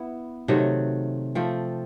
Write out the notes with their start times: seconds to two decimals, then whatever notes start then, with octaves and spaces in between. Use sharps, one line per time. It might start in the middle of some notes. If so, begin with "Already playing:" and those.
Already playing: B3 E4
0.48 C3 D#3 F#3 A3
1.35 F3 A3 C4